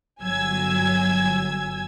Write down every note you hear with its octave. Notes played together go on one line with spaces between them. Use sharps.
G1 F#3 G#5 E6 G#6